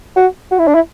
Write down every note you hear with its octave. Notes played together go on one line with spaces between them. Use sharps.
F#4
F#4
E4
D4
E4